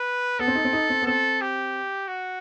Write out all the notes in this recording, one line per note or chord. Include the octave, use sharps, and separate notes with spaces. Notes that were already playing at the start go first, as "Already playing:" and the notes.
Already playing: B4
B3 A4
C4
D#4
C4
D#4
C4
B3
C4 A4
G4
F#4